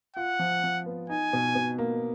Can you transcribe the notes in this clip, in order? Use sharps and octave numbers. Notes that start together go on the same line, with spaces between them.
F4 F#5
F3
F3
B3
D#4 G#5
B2
B2
A#3